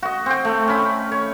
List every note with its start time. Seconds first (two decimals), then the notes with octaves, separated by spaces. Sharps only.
0.03 F#4 D#5
0.26 C4 G5
0.45 A3
0.67 C#4 B5
1.12 C#5